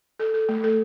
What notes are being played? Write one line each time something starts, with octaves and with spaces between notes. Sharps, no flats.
A4
A4
A3
A4